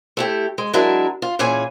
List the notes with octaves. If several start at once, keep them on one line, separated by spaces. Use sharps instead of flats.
A3 E4 G4
G#3
F#3 G#3 D4 E4 A#4
F4
A#2 E3 C#4 G#4 G#5